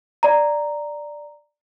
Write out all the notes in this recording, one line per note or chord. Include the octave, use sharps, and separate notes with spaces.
D5 A#5